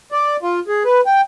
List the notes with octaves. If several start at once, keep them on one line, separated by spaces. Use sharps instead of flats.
D5
F4
G#4
B4
G5